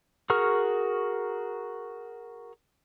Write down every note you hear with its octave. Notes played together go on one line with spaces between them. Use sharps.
F#4 G#4 A#4 C#6 F6